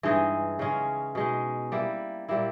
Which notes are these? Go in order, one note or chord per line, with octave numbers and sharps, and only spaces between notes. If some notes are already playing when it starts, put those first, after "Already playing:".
G2 E3 G#3 D#4
C#3 G#3 C#4
B2 G#3 D#4
G3 A#3 E4
A#2 G3 A#3 E4